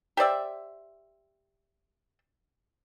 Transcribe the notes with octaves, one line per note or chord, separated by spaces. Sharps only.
G4 C5 D5 E5